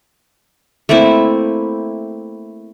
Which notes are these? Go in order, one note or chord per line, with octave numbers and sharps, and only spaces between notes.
A3 A#3 C4 E4